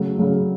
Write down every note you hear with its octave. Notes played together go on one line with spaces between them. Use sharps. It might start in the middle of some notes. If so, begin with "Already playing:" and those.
Already playing: C#3 F#3 A3
C#3 F#3 A3